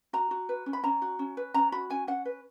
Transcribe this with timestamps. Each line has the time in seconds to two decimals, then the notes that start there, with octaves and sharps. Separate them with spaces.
0.13 F#4 A#5
0.31 F#4
0.49 B4
0.66 C#4
0.73 B5
0.84 C#4 A#5
1.02 F#4
1.19 C#4
1.37 B4
1.54 C#4 A#5
1.72 F#4 B5
1.90 C#4 G#5
2.08 C#4 F#5
2.25 B4